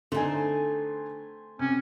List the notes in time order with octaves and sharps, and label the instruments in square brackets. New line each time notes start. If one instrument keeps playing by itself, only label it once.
[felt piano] D3 D#4 [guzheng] A3 C4 [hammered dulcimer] C5 G#5
[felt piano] C3 [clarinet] C#4